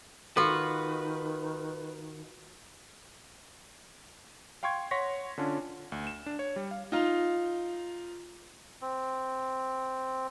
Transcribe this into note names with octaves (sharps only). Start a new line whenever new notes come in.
D#3 F4 F#4 A4 B4
F5 G5 C6 C#6 G#6
C#5 F#5 C6 C#6 A#6 B6
D3 C#4 D4 F4
D2
E7
D4
C#5
G3
F5
D#4 F4
C4